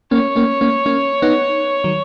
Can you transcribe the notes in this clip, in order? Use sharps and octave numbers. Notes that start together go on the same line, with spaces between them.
A#3 C#4 C#5
A#3 C#4
A#3 C#4
A#3 C#4
B3 D#4
D#3 F#3